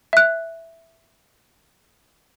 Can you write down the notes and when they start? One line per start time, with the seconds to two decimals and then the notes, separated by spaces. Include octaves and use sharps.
0.13 E5 F#6